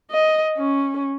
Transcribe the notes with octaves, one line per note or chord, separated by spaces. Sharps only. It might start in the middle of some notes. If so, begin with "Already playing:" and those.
D#5
C#4